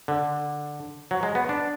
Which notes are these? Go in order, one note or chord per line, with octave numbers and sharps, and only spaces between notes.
D3
F#3
G#3
B3
D4